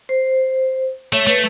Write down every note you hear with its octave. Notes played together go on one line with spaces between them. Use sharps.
C5
A3 C#5
A3 B4